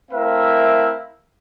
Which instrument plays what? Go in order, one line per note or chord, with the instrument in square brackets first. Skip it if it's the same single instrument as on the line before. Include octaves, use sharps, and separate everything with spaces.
[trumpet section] A3 C4 E4 A#4 E5 F5